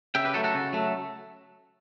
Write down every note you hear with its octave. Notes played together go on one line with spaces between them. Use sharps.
C#3 E5 G5
G4 B4
F#3 A3 F#4 A4
F#4 A4
C#3
F#3 A3